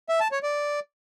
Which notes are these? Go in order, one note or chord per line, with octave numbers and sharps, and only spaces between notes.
E5
A5
C#5
D5